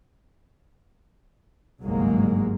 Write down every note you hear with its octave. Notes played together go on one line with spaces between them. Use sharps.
G1 C2 G#2 F#3 G#3 A#3